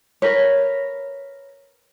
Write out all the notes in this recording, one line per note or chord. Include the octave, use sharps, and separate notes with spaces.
A#4 B4 C#5